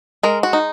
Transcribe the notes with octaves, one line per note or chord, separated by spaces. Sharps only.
G#3 A#4
F#4
D#4